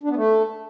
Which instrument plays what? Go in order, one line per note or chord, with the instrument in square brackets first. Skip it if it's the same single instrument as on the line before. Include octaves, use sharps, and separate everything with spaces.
[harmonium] D4
B3
A3